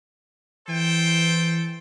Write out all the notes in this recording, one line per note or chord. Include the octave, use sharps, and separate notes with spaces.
E3 A4 C5 G5